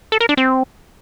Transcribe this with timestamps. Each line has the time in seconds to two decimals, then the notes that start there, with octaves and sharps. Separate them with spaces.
0.12 A4
0.21 A#4
0.29 D4
0.37 C4